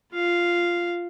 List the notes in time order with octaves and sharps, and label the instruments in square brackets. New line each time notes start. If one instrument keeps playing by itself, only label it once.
[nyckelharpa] F4 F5